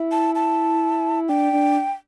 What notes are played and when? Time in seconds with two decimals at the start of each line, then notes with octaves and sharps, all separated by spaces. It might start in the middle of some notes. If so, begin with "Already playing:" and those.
Already playing: E4
0.12 A5
0.35 A5
1.29 D4 G5
1.53 D4